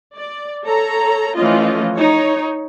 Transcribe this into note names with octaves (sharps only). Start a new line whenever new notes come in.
D5
A4 C#5 A#5
E3 F3 A3 C#4 F4 D#5
D#4 C#5